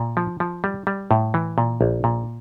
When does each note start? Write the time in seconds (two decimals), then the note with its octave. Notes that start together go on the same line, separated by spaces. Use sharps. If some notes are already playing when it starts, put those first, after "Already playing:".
Already playing: A#2
0.17 F3
0.40 F3
0.64 G3
0.87 G3
1.11 A2
1.34 E3
1.58 A#2
1.81 A#1
2.04 A#2